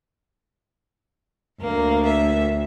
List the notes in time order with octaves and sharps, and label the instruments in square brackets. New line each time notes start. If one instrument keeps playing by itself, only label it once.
[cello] D2 [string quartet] A#3
[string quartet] E5